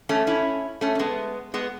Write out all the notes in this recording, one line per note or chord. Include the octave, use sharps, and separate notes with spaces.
A3 C#4
C#4 E4
A3 C#4
C#4
G#3 B3
G#3 B3